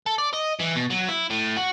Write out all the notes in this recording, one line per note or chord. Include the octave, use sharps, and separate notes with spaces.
A4
D5
D#5
E3
B2
F#3
E4
A2
F#4